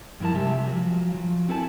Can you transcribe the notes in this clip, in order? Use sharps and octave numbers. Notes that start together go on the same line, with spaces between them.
G2 F3 E4 A#4 A5
C3 G3 G#3 G4 E5 G#5
F3 F#3
F3 F#3
C4 E4 A4 B4 G#5 A5